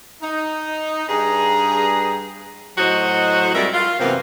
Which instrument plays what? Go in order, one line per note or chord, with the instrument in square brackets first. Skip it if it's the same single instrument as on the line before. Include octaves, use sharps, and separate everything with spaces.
[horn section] D#4
G2 G#4 A#5
[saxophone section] A2 F#3 D#4 F#4 C5 D#5
F2 G3 G#3 A#4 D5 E5
F4
F#2 C3 E3 A#3 B3 C5